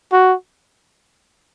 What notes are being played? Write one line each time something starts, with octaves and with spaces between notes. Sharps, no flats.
F#4